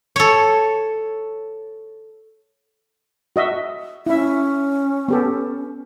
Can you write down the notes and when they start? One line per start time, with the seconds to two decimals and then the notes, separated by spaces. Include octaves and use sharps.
0.16 A4 C#5
3.36 F#4 D#5 E5
4.06 C#4 E4 E5
5.08 B3 G4 A4